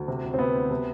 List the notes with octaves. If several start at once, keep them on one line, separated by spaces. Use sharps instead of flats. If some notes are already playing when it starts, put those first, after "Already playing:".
Already playing: D2
C3
D2
C4
D2 B3
D2
C3